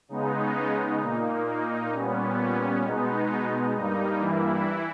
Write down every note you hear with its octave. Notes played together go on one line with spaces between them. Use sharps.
C#3 G#3 B3 D#4
A#2 A#3
D#4
A#2 G3 B3 C#4
C#4
B2 G#3 B3 D#4
G2 G3 A#3 D#4
E3 E4